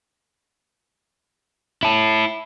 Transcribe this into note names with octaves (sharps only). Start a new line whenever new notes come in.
E4 A5